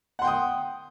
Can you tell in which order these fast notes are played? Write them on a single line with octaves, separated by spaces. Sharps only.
F#5 C6 G5 D#6